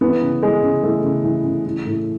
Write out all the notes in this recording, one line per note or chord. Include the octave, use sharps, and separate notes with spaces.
E3 B3
C#3
E3 G#3
C#3
E3 A3
C#3
E3
C#3
E3
A2